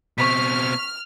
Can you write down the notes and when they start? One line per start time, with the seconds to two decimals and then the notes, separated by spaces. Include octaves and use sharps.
0.18 B2 C4 C#6 F6 B6